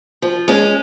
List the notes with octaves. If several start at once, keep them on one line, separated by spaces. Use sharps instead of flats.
F3
G#3 C#4